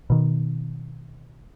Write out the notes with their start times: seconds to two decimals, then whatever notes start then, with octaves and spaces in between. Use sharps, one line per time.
0.10 B2 D#3